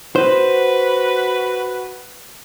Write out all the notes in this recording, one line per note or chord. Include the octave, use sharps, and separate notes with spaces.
F#4 B4 C5